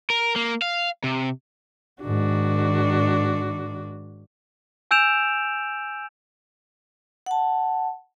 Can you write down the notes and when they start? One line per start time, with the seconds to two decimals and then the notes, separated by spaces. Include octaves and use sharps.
0.10 A#4
0.36 A#3
0.62 F5
1.04 C3
2.03 G#2 D#3 D4 F#4
4.91 G#5 E6 G6 D7 E7 F7
7.26 F#5 A5